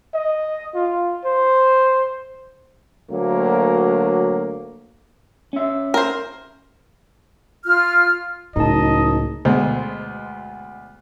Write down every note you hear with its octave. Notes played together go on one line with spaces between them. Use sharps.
D#5
F4
C5
D2 F#3 A#3
C#4 E5
A#4 C5
F4 F6
F#1 C#2 A2 D#4 D#5 A5
D2 B2 G#3 C5